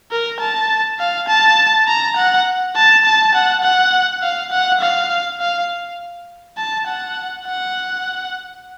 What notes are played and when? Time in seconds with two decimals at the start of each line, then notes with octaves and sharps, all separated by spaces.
0.12 A#4
0.40 A5
1.00 F5
1.28 A5
1.88 A#5
2.17 F#5
2.76 A5
3.05 A5
3.35 F#5
3.64 F#5
4.23 F5
4.52 F#5
4.81 F5
5.40 F5
6.57 A5
6.88 F#5
7.46 F#5